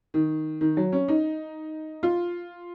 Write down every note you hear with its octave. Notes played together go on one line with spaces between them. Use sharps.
D#3
D#3
F#3
C#4
D#4
F4